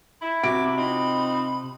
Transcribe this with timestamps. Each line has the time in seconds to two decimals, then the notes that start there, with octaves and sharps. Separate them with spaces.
0.22 E4
0.43 C3 F#4 D6 D7
0.76 C4 D#4 F4 B5